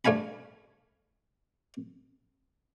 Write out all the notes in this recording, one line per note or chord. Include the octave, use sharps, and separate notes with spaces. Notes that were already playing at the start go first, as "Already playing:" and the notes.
G2 A3 F5 G#5 B5